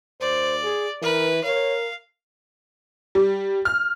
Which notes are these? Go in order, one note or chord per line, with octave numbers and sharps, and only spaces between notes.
D#2 C5 D5
G#4
E3 A#4 B4
A#4 C#5 F5
G3
F6